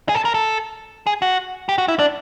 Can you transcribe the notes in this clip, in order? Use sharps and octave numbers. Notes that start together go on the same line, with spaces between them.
G#4
A4
A#4
A4
G#4
F#4
G4
F#4
E4
D4